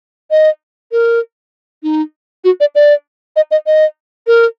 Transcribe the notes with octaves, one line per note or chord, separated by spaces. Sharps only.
D#5
A#4
D#4
F#4
D5
D5
D#5
D#5
D#5
A#4